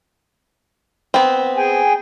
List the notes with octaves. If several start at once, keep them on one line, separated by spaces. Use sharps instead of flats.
B3 C4
G#4 G5 G#5